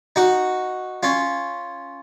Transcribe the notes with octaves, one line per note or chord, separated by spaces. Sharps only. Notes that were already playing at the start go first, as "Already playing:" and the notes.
D#4 F#4
C#4 F4